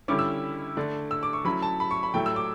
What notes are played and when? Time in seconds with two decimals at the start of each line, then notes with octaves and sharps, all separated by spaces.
0.08 D3 G3 C#4 E4 D6
0.19 E6
0.77 D3 A3 D4
1.11 E6
1.23 D6
1.33 C#6
1.45 F#3 A3 C#4 E4 B5
1.62 A5
1.80 B5
1.91 C#6
2.03 B5
2.14 A2 F#3 A3 E4 G5
2.26 E6
2.36 D6